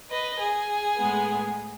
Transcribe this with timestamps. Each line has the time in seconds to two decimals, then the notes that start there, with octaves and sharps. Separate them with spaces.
0.10 B4 D#5
0.40 G#4
0.97 A2 G#3 B3